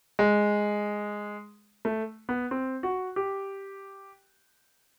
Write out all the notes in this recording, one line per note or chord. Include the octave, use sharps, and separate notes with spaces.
G#3
A3
B3
C4
F#4
G4